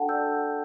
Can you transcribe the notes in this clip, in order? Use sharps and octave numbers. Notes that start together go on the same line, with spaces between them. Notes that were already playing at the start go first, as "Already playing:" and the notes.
Already playing: D4 F#4 A4 F#5 G5 A5
D5 E6 G6